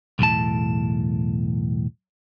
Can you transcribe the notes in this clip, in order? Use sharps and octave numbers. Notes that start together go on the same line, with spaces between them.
B1 E2 A2 A5